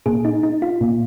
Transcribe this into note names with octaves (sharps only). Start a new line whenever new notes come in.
A#2 G#4
D#4
D#4
F4
A#2